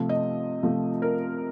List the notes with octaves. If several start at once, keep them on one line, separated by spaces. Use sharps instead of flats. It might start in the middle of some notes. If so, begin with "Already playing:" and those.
Already playing: C3 F3 A3
D#5
C3 F3 A3
A#4